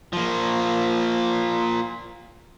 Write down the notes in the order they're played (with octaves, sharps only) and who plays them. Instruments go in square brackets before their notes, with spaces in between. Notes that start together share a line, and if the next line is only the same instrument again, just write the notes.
[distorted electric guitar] F3 A#3